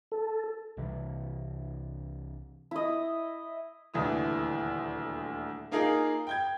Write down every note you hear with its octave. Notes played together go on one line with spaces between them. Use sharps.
A4
C2 C3 E3
E4 D#5
D#1 D2 E3 D#6
A#3 D#4 F4 G#4 A#4
G5 G6 G#6